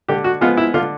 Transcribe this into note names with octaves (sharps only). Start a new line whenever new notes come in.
D3 G4
F#4
F3 G#3 B3 F4
E4
D3 F4